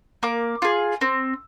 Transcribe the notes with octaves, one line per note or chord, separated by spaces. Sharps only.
A#3 D6
F4 G#4
C4